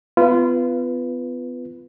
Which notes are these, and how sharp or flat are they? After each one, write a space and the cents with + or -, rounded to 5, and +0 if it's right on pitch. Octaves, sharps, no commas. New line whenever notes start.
B3 +30 F4 -25 B4 +0